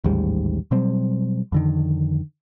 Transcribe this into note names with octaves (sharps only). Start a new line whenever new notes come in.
A1 D#2 G#2 G3
B2 F#3 G3 C4
F2 D3 D#3